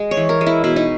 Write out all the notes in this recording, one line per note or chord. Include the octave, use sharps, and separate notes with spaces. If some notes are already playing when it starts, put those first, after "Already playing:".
Already playing: G#3
C#5
E3
A#4
G#3
E4
B2 E4
D#4